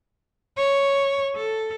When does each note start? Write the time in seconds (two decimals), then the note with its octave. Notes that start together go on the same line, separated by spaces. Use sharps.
0.57 C#5
1.36 A4